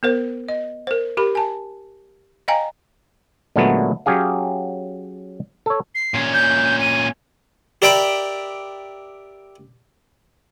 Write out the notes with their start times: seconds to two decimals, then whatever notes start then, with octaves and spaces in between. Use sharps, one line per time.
0.03 B3 A#4 C5
0.48 D#5
0.87 A#4 C5
1.17 G4 A#4 B5
1.35 G#5 A5
2.48 D#5 F5 G5 G#5 A#5
3.56 A#2 D3 F#3 G#3 A3 B3
4.06 F#3 C#4 G4 G#4 F5
5.66 A4 C#5
5.95 C7
6.14 A#2 C#4
6.34 G6
6.81 D#7
7.82 G4 A#4 D5 E5 G5 B5